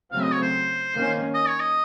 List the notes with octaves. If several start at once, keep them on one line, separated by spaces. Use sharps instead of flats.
C#3 F#3 A3 C4 F5
D#5
C#5
C5
D#3 A#3 C#4
D#5
C#5
D#5